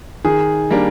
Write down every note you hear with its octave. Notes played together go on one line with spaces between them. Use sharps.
D#3 G#4
G3 A#3 D4